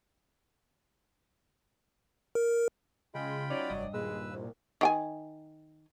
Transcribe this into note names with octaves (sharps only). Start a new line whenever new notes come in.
A#4
C#3 G#3 F4 G5 B5
F#3 C#4 D#4 C#5 D5
F1 G2 D#5
D#2 A#2 G#3 B4 E6
C2
D#3 G5 G#5